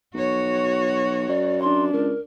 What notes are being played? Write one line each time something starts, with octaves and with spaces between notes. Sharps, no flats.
B1 F#4 C#5
F#2 D5
D4 C6
C#2 A#4